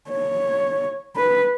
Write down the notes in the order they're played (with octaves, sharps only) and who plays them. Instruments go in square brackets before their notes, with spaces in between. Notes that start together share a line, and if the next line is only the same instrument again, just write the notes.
[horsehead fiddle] C#5
B4